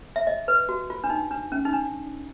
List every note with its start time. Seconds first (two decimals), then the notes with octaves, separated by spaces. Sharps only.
0.16 E5
0.27 D#5
0.48 B4
0.69 F#4
0.90 F4
1.04 D4
1.10 D#4
1.31 D4
1.52 C#4
1.65 D#4
1.73 D4